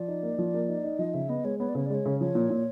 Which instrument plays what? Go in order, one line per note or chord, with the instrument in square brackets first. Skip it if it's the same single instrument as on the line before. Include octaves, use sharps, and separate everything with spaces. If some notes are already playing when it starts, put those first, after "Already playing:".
Already playing: [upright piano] F3 [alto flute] D5
[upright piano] D#4
A#3
F3
A#3
D#4
D#4
[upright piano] F3 [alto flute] D#5
[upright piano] C#3 [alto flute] E5
[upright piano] B3 [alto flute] D#5
[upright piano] G#3 [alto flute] C#5
[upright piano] B3 [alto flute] C#5
[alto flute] D5
[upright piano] C#3 [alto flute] C#5
[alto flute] D5
[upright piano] G#3 [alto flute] C#5
[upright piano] C#3
[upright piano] F3 [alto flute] C#5
[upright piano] A#2
A#2